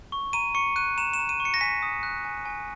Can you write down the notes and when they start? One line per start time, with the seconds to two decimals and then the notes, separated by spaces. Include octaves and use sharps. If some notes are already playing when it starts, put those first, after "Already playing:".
0.12 C#6
0.33 A#5 D#7
0.55 C#6 C#7
0.76 F#6 D#7
0.97 A#5 E7
1.13 E7
1.19 A#5
1.29 D#7
1.40 C#6
1.45 C#7
1.54 A#6
1.61 G#5 B6
1.82 D#6
2.03 F#6
2.25 G#5
2.45 G#5